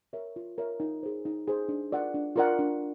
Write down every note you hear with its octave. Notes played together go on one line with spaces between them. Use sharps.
A#4 C#5 E5
F4
A#4 C#5 E5
D#4
G#4 C5
D#4
G#4 C5
D4
F4 A#4 D5 F#5
D4
F4 A#4 D5 F#5
D4